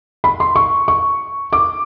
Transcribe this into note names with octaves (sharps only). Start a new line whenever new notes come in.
B5
C6
C#6
C#6
D6